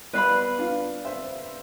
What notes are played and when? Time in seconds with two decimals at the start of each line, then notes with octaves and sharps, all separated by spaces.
0.13 G3 B3 B4 F5 B5
0.59 D4 F4
1.05 C5 E5